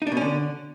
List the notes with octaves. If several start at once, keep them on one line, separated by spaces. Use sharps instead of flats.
D#4
D4
B2
C#4
D3